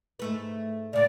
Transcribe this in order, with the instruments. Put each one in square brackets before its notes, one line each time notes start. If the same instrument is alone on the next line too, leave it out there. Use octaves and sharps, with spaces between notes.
[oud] G#2 A3 B4
[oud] A2 C#3 [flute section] D5